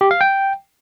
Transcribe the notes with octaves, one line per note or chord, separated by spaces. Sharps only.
G4
F5
G5